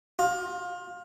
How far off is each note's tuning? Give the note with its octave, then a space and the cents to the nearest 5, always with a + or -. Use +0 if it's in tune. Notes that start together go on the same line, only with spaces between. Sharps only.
F4 +25